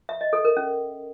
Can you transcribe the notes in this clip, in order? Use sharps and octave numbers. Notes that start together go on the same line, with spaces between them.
E5
D#5
A4
A#4
C#4